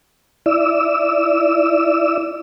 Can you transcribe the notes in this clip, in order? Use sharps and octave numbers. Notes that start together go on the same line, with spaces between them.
E4 D5 E6